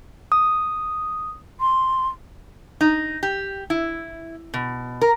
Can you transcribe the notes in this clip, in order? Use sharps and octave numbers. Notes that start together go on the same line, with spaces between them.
D#6
C6
D#4
G4
E4
B2
A#4